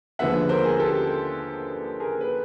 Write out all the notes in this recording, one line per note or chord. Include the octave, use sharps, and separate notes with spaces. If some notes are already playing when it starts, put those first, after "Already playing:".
D#2 D3 F3 G#3 B3 E5 F#5
A#4 C5
G#4 A#4
G4 A4
G#4 A#4
B4